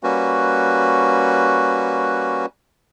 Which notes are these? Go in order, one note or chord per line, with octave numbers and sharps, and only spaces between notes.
G3 A#3 C#4 F#4 B4